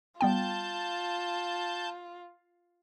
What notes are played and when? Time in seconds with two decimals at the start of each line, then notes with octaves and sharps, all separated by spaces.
0.21 G3 B3 F4 G5 A5 G6